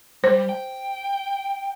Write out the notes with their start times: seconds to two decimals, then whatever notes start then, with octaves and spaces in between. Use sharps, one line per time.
0.24 G3 C5
0.49 G5